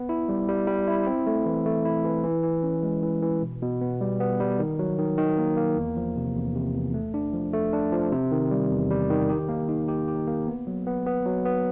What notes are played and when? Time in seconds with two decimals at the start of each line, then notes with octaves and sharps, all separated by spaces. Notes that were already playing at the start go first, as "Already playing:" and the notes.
Already playing: B3
0.09 E4
0.29 G3
0.49 G3
0.67 G3
0.88 E4
1.07 C4
1.27 A3
1.46 E3
1.66 A3
1.85 E4
2.05 E3
2.24 E3
2.43 E3
2.63 C#4
2.83 G#3
3.03 E3
3.22 E3
3.42 B2
3.62 B2
3.81 B3
4.01 G3
4.20 B3
4.40 G3
4.59 D#3
4.79 F#3
4.98 D#3
5.18 D#3
5.38 A#3
5.57 A#3
5.77 E2
5.97 F3
6.16 C3
6.36 E2
6.55 C3
6.75 E2
6.94 A3
7.14 D4
7.33 F3
7.53 A3
7.73 D4
7.92 F3
8.12 C3
8.32 D#3
8.51 G3
8.71 E2
8.90 G3
9.10 D#3
9.29 G4
9.49 A#3
9.69 D#4
9.88 G4
10.08 G4
10.27 A#3
10.47 B3
10.67 F#3
10.87 B3
11.06 B3
11.26 F#3
11.45 B3